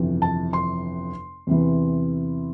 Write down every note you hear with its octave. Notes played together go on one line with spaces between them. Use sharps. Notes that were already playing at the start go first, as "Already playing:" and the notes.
Already playing: G1 F2 C3 E3
A5
C6
E2 C3 E3